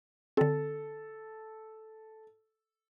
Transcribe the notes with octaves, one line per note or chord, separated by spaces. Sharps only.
D3 C4 A4